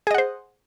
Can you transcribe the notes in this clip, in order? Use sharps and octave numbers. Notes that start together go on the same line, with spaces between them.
G#4 C5 D#5 F#5